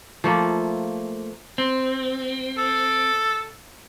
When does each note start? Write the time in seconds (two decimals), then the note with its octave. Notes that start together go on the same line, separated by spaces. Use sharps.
0.24 F3 A3 A#3
1.58 C4
2.58 A4